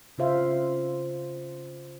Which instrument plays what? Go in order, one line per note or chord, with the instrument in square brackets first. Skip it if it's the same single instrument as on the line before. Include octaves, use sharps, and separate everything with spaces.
[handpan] C#3 F4 C5 E5 F5